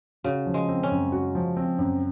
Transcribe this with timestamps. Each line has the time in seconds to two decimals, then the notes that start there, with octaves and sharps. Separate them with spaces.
0.24 C#3 F#4
0.47 F3
0.54 G#3
0.69 C4
0.83 C#4
0.91 F#2
1.12 F#4
1.35 F3
1.57 C4
1.79 F#2